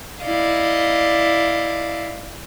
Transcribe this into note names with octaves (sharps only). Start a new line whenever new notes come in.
E4 D5 D#5 F5